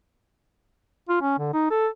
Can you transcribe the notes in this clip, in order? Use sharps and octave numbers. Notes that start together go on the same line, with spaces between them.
F4
C#4
D3
D#4
A4